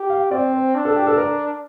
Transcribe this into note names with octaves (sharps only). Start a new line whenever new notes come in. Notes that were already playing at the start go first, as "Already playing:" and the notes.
Already playing: G4
F5
C4 D5
C5
D4
A4
G4
A4
A#4